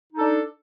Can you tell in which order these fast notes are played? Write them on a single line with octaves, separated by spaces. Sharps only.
D#4 A4 D4